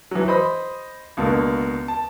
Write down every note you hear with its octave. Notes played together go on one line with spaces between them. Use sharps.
E3 F#3
C5 D#5 B5
C#2 B2 D3 A#3
A5